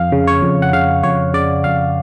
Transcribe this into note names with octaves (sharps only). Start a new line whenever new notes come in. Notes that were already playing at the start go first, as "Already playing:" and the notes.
Already playing: F2 F5
C#3
C#5
F2
F#5
C#3 F5
F2 C#5
C#3 D5
F2 F5